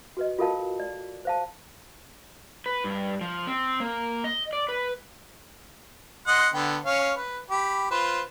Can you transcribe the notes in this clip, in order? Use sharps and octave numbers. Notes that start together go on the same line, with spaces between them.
F#4 B4 D#5
F4 F#4 A4 A#4 F5 A5
D5
C5 F5 A5
B4
G2
F3
C4
A#3
D#5
D5
B4
D#5 F#5 C6
D3 B3 G5
C#4 C#5 F5
B4
G4 B5
F4 B4 C5